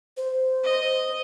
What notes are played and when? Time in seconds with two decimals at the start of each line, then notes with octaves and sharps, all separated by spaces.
0.17 C5
0.64 D#5